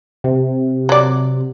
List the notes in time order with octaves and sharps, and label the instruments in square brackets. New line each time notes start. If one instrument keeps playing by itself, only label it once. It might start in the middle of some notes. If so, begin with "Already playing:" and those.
[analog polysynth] C3
[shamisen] F#3 D5